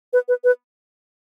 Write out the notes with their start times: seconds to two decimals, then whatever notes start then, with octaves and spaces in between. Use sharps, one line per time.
0.13 B4
0.28 B4
0.44 B4